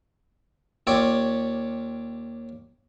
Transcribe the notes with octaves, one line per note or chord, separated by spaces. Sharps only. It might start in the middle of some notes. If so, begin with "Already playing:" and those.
D#2 F4 G4 C#5 D5 C#6